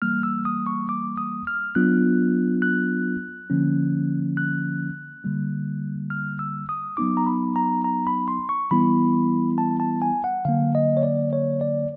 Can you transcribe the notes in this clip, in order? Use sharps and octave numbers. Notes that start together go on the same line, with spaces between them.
E3 G3 A#3 F6
E6
D#6
C#6
D6
D#6
F6
F#3 B3 D4 F4 F#6
F#6
D3 F3 A#3 C#4
F#6
D3 G3 A#3
F6
E6
D#6
F#3 B3 D#4 D6
A#5
B5
A#5
A#5
B5
C6
C#6
E3 G3 B3 E4 B5
A5
A5
G#5
F#5
D3 F#3 A#3 F5
D#5
C#5
D5
C#5
D5